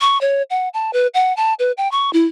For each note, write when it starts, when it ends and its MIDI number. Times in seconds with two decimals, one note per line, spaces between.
0.01 0.20 85
0.21 0.43 73
0.50 0.69 78
0.74 0.91 81
0.93 1.07 71
1.14 1.35 78
1.37 1.54 81
1.59 1.72 71
1.77 1.90 79
1.92 2.12 85
2.13 2.27 64